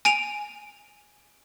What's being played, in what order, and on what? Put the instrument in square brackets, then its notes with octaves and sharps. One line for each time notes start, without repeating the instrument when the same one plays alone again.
[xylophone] G#5 D7 D#7 F7